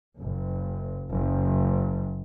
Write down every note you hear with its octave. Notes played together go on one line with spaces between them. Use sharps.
F#1
F#1